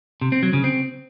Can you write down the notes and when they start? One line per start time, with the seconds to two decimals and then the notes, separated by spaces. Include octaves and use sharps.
0.21 C3
0.32 C4
0.43 F#3
0.53 C#3
0.64 C4